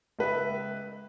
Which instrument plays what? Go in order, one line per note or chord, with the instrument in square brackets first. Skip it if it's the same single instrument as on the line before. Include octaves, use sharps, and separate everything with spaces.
[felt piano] C#2 B4 D#5 E5